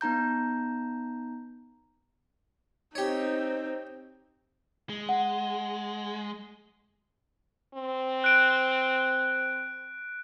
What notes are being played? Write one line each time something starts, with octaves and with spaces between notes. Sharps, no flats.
B3 D#4 A#5 G6
C4 D#4 G4 C#5
G#3
F#5
C4
F#6 D7